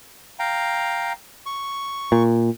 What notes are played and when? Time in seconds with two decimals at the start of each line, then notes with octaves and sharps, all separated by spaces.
0.39 F5 G5 A#5
1.46 C#6
2.12 A#2